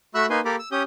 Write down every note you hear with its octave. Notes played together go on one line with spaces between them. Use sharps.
A3 F#4 E5 B5 E6 F#6
A#3 D#4 B4 G#5 C6
A#3 G4 A4 A#4 B5 D6
E6
C#4 G4 D#6 G6